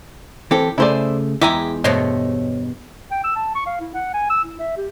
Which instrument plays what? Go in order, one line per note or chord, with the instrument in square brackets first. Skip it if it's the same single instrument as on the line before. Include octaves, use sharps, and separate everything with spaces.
[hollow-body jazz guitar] E3 C4 A4 [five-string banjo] G4
[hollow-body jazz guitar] C#3 A3 G#4 [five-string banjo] E4 C5 D5
[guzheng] E2 G#3 G#5 [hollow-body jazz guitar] E4 [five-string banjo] G4 E5 A#5
[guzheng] G2 B2 C6 [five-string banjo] A3 [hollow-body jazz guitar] C5 C#5 D#5
[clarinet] G5
E6
A5
C#6
F5
E4
F#5
G#5
E6
E4
E5
G4